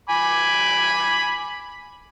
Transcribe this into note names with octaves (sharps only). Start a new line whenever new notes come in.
G#5 B5 D6